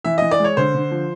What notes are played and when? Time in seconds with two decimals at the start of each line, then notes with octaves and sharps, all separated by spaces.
0.04 E3 E5
0.18 E3 D#5
0.31 D5
0.39 G#3
0.44 C#5
0.57 D3 C5
0.74 D3
0.91 F3